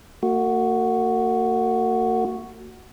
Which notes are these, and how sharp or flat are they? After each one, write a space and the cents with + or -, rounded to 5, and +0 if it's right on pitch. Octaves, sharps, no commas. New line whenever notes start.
A#3 -45 F#4 +0